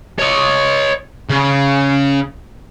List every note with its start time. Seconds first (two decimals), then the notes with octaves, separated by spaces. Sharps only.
0.19 C#5 D#5
1.30 C#3